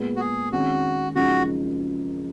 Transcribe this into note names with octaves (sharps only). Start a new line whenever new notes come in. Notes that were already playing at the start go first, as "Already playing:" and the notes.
Already playing: A#2 G#3 B3
F#4
G#4
F2 D#3 G#3 C#4 F#4 G#4
F#1 F#2 F3 G#3 D#4 F#4